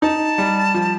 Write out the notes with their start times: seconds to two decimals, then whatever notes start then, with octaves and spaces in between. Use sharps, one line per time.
0.02 D#4 A5
0.38 G3
0.74 F3